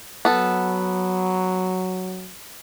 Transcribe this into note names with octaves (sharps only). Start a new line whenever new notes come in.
F#3 B3 A4